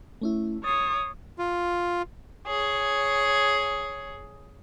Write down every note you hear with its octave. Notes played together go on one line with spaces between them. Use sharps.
A3 C#4 E4
C#5 D#6 A6 C7
F4
G#4 C#5